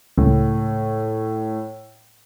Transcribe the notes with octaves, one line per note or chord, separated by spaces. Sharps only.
C#2 A2